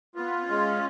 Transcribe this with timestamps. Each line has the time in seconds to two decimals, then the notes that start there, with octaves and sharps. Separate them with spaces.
0.15 B3 F4
0.49 G#3 C#4